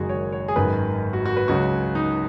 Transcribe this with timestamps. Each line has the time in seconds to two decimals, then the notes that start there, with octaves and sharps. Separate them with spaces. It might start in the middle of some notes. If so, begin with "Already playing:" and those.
Already playing: F#1 F#2 D#3 G#3 F#4 G#4
0.09 C#5
0.32 C#5
0.48 G#4
0.56 G#1 F#2 D#3 G#3 B4
1.13 F#4
1.26 F#4
1.37 B4
1.48 C#2 C#3 F#3 F#4
1.95 D#4